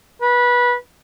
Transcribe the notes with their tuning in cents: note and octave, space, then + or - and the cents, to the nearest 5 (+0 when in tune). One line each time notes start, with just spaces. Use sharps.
B4 -20